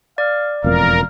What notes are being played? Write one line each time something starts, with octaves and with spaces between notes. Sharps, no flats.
D5 F5
E1 F2 A2 A#4 F5